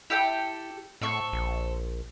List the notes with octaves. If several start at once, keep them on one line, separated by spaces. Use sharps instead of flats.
E4 G4 A4 G5
A2 C4 A4 C#6
A#1